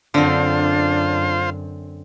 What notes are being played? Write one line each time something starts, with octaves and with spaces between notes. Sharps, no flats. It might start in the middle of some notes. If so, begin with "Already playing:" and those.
F#2 D3 C4 D4 F4 C5